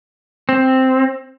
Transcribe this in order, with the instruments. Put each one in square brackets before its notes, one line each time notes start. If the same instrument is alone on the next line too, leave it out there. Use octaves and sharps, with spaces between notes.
[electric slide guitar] C4